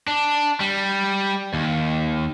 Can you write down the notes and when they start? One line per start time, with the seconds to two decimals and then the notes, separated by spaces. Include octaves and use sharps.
0.08 D4
0.60 G3
1.54 D#2